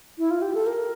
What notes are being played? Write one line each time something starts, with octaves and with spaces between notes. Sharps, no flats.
E4
F4
G4
A4
A#4